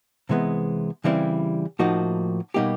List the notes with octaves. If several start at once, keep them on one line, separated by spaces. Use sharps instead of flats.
C3 E3 G#3 B3
C#3 E3 G3 C4 E4
A2 F3 A#3 D#4 F#4
B2 G3 A#3 D#4 G4